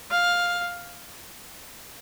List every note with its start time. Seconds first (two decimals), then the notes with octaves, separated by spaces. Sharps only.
0.11 F5